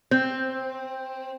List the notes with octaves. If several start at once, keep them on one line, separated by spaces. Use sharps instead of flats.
C4